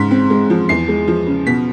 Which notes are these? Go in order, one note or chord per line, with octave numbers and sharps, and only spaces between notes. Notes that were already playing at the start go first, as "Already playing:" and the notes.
Already playing: G#2 C#3 B6
C4
G#3
F3
E2 C7
G#3
F3
C#3
B2 B6